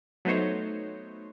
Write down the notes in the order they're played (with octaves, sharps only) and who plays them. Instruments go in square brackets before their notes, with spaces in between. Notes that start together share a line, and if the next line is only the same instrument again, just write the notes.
[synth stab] F#3 A3 B3 D#4 C5 C#5